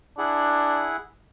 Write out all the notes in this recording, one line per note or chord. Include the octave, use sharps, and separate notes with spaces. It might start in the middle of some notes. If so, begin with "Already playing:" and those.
D4 E4 G#4 F#5